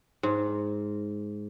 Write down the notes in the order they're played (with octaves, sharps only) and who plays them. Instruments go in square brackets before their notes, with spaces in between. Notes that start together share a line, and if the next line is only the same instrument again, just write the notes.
[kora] G#2